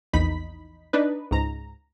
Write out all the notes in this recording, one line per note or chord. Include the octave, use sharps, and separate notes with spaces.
A#1 E2 D#4 B5 B6
D4 D#4 B4
C#2 G#2 A#5